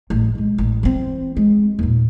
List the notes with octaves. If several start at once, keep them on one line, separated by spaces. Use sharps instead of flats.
A1
B1 G#3
A1
E3 C4
G#3
D#2 A#2